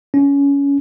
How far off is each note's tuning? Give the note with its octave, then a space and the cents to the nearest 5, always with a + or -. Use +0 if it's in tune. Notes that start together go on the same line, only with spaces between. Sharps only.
C#4 +20